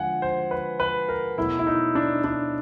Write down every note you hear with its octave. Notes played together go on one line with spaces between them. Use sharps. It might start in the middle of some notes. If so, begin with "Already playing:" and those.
Already playing: D3 F3 G#3 F#5 G#5
C5
B4
B4
A#4
B2 F#3 A3 E4
E4
D#4
D4
D4